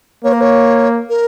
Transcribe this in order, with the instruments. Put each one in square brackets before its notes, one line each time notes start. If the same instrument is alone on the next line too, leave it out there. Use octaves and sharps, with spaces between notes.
[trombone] A#3 [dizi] C#5
[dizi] A#4
C#5
A#4